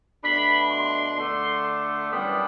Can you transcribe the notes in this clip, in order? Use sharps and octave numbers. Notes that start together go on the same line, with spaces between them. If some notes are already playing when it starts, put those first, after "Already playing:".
B2 A3 D4 B5
C6
D3 A3 D4
F#2 E3 G3 B3 D4